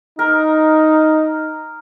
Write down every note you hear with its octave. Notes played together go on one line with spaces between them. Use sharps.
D#4 A#4